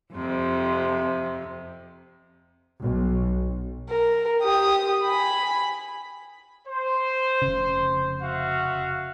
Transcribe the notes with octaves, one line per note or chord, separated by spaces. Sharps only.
F2 C3
B1
A#4
G4 D#6
G#5 B5
C5
F1 C#3
F#4 E5 F5